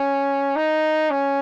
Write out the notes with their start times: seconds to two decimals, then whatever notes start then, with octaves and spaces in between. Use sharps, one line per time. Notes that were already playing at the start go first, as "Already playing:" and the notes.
Already playing: C#4
0.56 D#4
1.10 C#4